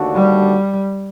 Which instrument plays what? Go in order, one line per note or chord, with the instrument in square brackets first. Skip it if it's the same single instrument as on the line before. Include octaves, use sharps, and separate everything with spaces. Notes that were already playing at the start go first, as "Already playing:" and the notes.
Already playing: [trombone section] D#2 D3 A3 D4 F#4
[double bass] G3